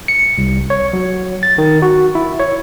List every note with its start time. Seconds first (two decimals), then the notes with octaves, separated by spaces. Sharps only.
0.08 C#7
0.38 C2
0.70 C#5
0.93 F#3
1.43 A6
1.58 D#3
1.82 F#4
2.15 E4
2.40 C#5